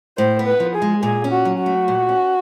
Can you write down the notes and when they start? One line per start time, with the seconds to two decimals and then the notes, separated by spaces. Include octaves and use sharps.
0.17 A2 C5
0.39 B3
0.47 B4
0.60 F3
0.74 G#4
0.82 G#3
1.03 A#2 G#4
1.24 C#4
1.31 F#4
1.45 F#3
1.59 F#4
1.66 A3
1.88 A#2
2.09 C#4